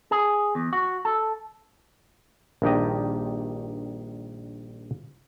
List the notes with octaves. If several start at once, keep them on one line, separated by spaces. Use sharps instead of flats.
G#4
E2
F#4
A4
A#1 G2 D#3 G4 D#5